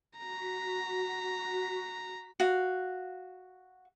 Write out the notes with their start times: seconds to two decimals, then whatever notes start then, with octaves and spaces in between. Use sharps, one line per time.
0.18 F#4 A#5 B6
2.40 F#4 F5